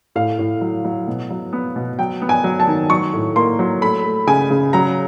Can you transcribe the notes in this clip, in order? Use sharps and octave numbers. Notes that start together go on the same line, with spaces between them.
A2 F5
A2
F#3
F#3
B2
F#3
B3
B2
F#3 G5
B3
G#5
F#3
A5
D#3
F#3 C#6
A2
A#3 C6
F#3
A3 B5
A3
C#3 G#5
C#3
F#3 A#5